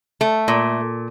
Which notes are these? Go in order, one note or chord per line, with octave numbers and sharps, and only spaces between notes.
A3
A#2